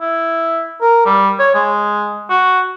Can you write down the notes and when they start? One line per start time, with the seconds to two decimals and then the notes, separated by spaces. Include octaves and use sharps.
0.01 E4
0.81 A#4
1.06 G3
1.39 C#5
1.55 G#3
2.30 F#4